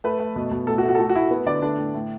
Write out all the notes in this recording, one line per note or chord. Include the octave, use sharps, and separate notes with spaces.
A3 B4
A3
B2
B2
A2 A4
F#4
A3
F#4
A4
A3 F#4
F#4
A3 E4
B3
D3 D5
A3 D4
A2
A2